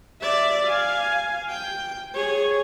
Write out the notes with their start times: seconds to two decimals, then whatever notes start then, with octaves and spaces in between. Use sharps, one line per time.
0.21 D5 E5
0.65 F5 G#5
1.50 G5
2.14 G#4 C#5